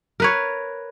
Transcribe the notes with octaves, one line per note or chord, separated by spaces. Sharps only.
A#4 B4 C#5